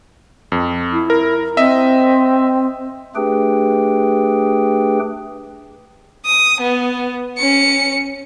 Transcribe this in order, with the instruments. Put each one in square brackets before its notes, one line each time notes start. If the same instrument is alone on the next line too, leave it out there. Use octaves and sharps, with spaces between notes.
[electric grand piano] F2
[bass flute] E4
[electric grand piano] A#4
[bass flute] C4 [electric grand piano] D#5 E5
[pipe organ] A3 D4 G4 G#4 B4 G5
[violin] D#6
B3
C#4 C#7